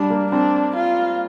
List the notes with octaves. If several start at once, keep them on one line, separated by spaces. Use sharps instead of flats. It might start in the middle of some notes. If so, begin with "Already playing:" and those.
Already playing: G3 D4
A#3
C4 D4
F4